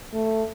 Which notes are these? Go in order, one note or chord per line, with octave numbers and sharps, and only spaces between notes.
A3